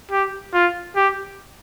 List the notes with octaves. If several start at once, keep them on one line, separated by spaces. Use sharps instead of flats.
G4
F4
G4